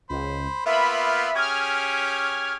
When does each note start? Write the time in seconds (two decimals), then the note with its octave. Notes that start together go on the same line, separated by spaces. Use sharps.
0.10 C#2 C5 B5
0.66 A#3 B3 F4 E5 B5
1.36 C#4 G4 G#4 F6 G#6